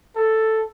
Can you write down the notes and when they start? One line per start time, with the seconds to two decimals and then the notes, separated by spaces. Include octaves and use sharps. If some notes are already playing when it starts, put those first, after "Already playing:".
0.16 A4